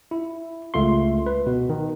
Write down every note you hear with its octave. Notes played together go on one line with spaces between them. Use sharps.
E4
C#2 A3 F4 C6
B4
B2
D#3